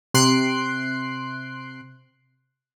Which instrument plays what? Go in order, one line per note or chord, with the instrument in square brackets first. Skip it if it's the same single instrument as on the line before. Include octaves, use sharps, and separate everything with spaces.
[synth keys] C3 C6 F#6 C7 D7